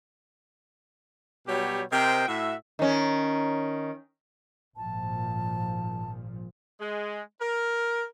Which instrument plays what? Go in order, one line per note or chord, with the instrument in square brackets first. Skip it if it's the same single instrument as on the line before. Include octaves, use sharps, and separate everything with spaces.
[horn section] B2 F#3 G3 G4 C#5
C3 A#4 C5 D#5 G5
A2 F#4 E5
[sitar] D#3 C#4
[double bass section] G#1 A#2 F3 [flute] A5
[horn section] G#3
A#4